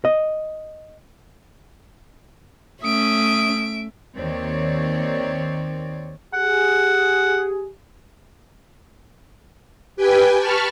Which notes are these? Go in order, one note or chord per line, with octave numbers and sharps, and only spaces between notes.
D#5
A3 C#4 E5 D#6 D7
D#2 D#3 C4 C#5 D5
G4 G#4 F#5
G4 B4 G5 G#5
A5 B5 C#6 F6